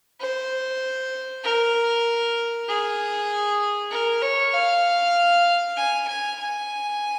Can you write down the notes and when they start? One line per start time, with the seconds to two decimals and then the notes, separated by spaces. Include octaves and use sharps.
0.20 C5
1.44 A#4
2.68 G#4
3.91 A#4
4.22 C#5
4.53 F5
5.77 G#5
6.08 G#5
6.39 G#5